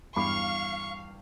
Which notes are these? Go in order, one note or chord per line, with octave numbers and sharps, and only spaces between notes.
E2 G2 F5 B5 C#6 D6